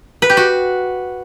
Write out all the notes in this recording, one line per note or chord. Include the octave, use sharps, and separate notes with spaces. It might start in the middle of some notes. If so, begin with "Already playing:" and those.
B4
G4
F#4